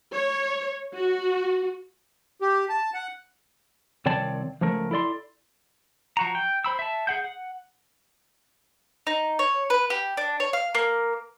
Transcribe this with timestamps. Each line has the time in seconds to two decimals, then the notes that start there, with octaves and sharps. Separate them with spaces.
0.12 C#5
0.94 F#4
2.42 G4
2.69 A5
2.94 F#5
4.06 C2 D#3 C4 C#5 D5 A5
4.61 C#2 F3 A3 A#4
4.91 E4 A4 D5 C6
6.17 F3 F#4 A#5
6.35 G5
6.64 C5 B5 E6
6.79 E5 A5
7.07 G#4 F#5 G6
7.24 F#5
9.07 D#4
9.39 C#5
9.70 B4
9.90 G4
10.17 D4
10.40 C#5
10.53 F5
10.75 A#3